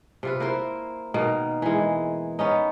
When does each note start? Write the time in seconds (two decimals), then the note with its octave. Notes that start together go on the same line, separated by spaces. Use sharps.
0.23 C3 F4 B4
0.40 A#3 E4 A#4 C5
1.14 B2 D#3 A#3
1.62 E3 G#3
2.39 B3 C#4 D#4